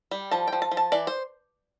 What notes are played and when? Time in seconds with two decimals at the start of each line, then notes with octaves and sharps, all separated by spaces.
0.11 G3
0.31 F3 A5
0.48 G5
0.53 F3
0.62 A5
0.71 F3
0.77 A5
0.92 E3 D5
1.07 C5